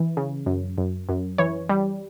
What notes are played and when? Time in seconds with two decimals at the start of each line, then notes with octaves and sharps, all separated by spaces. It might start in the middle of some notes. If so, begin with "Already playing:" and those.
Already playing: E3
0.17 C#3
0.46 F#2
0.78 F#2
1.09 F#2
1.38 E3 C#5
1.69 G3